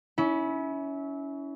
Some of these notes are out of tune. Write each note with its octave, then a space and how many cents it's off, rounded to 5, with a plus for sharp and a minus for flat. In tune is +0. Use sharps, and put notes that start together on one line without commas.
C#4 +25 E4 -20